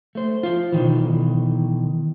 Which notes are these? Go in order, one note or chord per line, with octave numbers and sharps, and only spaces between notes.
A3 C5
F4 C5
B2 D#3 E3